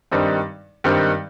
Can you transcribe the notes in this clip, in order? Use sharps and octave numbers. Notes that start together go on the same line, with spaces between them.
G2 D#3 G3 C4 D#4
G2 D#3 G3 C4 D#4